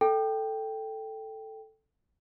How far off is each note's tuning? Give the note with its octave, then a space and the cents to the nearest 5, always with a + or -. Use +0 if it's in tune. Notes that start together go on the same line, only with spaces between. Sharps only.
A4 +0 G5 +0